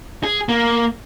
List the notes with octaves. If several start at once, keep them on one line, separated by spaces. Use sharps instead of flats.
G#4
A#3